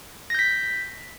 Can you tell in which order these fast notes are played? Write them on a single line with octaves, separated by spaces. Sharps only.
A#6 G6 B6